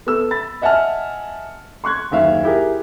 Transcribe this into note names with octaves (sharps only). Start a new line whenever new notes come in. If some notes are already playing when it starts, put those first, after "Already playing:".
B3 A4 E6
B5 A6
D#5 E5 F#5 G#5 A5 F6
C6 C#6 F#6 G#6
F#1 D#2 E5 F5
E4 G4 G#4 A#4